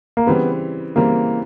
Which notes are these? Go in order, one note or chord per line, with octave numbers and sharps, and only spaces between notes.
A#3
C#3 E3 G3 B3 C4
C#3 E3 G3 A#3 C4